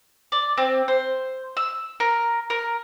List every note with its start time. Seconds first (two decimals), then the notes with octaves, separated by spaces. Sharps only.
0.32 D5
0.58 C4
0.88 C5
1.57 E6
2.00 A#4
2.50 A#4